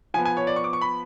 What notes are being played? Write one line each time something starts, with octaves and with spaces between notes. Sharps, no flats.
F3 B3 G#5
G#5
C#5
D5
C#6
D6
C#6
B5